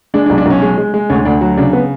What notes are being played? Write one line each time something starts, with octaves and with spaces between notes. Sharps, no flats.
G#3 D4
D4
B1
D4
B1 C#4
G#3
G#3
G#3
D2 C#4
D2 D4
F#3 F#4
C#3 D4
B3